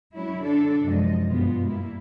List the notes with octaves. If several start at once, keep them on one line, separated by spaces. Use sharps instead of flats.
F#3 C#4 E4
D3 D4 A4
F#2 C3 F3 G#3 D#5
G2 B2 G#3 B3 F4
G3 A#3 E4